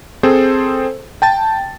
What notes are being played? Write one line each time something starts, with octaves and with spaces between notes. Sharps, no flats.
C4 G#4 A4 C5
G5 A5 A6